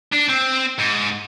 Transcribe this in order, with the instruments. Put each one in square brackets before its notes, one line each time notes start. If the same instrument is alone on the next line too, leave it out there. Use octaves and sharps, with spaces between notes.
[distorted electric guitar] D4
C4
G#2